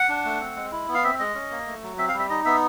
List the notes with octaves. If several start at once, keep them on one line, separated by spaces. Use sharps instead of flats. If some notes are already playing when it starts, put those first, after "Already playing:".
Already playing: F#5
D4
A3
C4
G#3
E4
B3
F5
C4 E5
G#3 D#5
C#4
A#3
A3
F#3
C4 E5
F5
G3
E5
D#4 D#5
B3 E5